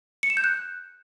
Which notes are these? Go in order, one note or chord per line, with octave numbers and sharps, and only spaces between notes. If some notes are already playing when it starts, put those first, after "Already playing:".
C#7
E7
G6
F#6